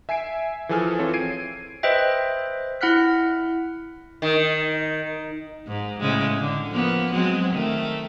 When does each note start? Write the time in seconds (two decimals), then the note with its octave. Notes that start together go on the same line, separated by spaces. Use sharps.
0.09 E5 G#5 G#6 C7 D7
0.69 E3 F3 G#4 A4 G#5 F6
0.98 E3 C4 F4 A4 C#5
1.14 G#6 C7 D7 D#7
1.83 B4 C5 D#5 E5 G5
2.81 E4 F#5 F6 F#6 B6
4.22 D#3
5.67 G#2
6.01 A2 C#3 G#3
6.38 D3
6.70 F3 A#3 B3
7.13 F#3 G#3 C4
7.53 D#3 A3